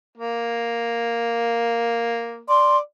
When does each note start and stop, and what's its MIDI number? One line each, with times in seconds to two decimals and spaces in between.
0.17 2.42 58
2.49 2.80 74
2.49 2.77 84